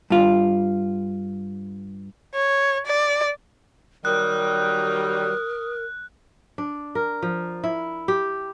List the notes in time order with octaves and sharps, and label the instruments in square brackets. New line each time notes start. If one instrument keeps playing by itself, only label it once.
[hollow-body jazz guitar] G2 F4
[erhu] C#5
D5
[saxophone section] D#3 F#3 G3 [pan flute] A#4 [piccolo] D#6 [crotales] F#6
[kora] D4
A#4
F3
E4
G4